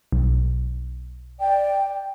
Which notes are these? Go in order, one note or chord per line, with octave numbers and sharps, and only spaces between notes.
B1
D5 G5